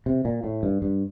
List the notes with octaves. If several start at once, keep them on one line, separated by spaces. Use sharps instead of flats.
C3
A#2
A2
G2
G2